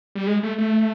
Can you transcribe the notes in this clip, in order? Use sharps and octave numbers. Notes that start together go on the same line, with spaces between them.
G3
G#3
A3
A3